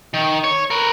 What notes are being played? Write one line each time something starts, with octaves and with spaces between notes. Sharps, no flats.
D#3
C#5
A#4 B4